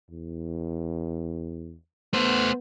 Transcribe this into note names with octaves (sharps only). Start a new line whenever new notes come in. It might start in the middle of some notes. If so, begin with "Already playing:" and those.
E2
A3 B3 C5